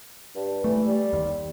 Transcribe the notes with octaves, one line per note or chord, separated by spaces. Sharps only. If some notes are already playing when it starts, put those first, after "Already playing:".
G2
E3 A3
G3
D#2